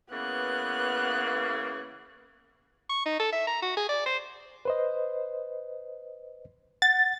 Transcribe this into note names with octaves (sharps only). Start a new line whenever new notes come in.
C#3 E3 A#3 B3 F#6
C#6
D#4
A4
E5
A#5
F#4
G#4
D5
C5
B4 C5 D#5
F#5 A6